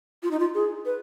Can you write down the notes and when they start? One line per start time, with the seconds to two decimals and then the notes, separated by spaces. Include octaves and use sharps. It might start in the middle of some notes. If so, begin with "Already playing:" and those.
0.23 F4
0.31 D#4
0.39 F4
0.55 G#4
0.86 B4